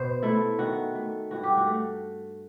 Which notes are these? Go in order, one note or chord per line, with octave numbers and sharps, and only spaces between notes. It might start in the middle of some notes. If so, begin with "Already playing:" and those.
Already playing: B2 B3 C5
A3 E4
D#3 F#4
A3
G2 F#4
G4
F#4
A3